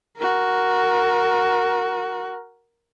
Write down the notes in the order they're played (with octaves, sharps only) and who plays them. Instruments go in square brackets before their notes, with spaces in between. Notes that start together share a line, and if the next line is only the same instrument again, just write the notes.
[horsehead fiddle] F#4 A#4